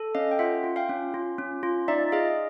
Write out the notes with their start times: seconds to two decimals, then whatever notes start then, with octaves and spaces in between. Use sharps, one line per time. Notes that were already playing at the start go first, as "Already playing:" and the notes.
Already playing: A4
0.15 C#4 D#5 F5
0.31 G5
0.39 F4 E5 F#5
0.64 F4
0.76 F5 G5
0.89 C#4
1.14 F4
1.38 C#4
1.63 F4
1.88 D#4 D5 E5
2.12 G#4 D#5 F5